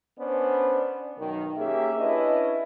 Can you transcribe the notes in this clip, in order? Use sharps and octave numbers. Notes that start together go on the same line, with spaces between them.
B3 C#4 D4 C5 D5
B1 D#3
A#3 C#4 G4 G#4 E5
C#4 D4 E4 B4 D#5